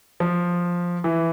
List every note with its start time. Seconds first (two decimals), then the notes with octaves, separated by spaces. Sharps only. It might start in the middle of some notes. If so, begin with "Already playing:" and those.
0.20 F3
1.04 E3